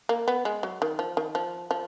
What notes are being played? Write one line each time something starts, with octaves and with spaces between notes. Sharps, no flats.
A#3
B3
G#3
F#3
D#3
F3
D#3
F3
F3